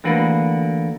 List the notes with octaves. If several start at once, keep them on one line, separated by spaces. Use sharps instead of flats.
D3 E3 A3 A#3 F#4 B4